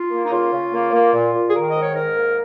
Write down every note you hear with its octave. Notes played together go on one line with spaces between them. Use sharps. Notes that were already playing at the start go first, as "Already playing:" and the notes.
Already playing: F4
A#3
D#4
C#3 F4
C#3
A#3
A#3
A#2
A#2
G#4
D#3 A#4
G#2 D#5
C#5
G#2 A#4
A#3